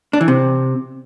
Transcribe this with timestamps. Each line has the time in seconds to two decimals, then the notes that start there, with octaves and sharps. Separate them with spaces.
0.13 D4
0.21 E3
0.28 C3